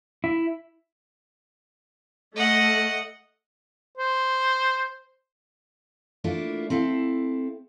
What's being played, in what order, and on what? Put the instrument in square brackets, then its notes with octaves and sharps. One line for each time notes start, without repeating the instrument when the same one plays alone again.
[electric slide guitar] E4
[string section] A3 [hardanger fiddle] D#5 F#5
[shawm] C5
[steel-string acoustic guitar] A3 A#3 D4 E4 F4
C4 E4 A4 F5